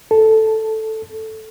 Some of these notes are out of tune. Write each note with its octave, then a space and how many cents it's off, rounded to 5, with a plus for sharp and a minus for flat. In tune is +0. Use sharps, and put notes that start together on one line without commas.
A4 +0